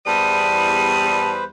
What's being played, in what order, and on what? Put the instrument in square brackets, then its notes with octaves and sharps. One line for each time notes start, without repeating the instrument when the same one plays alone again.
[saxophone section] E2 G3 [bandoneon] B4 C5 [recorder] A5 [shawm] D#6